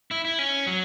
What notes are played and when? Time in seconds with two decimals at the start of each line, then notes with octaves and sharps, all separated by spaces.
0.11 E4
0.25 E4
0.39 C#4
0.67 F#3